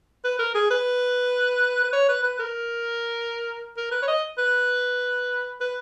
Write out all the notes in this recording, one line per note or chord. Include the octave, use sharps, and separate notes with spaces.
B4
A#4
G#4
B4
B4
C#5
B4
B4
A#4
A#4
B4
C#5
D#5
B4
B4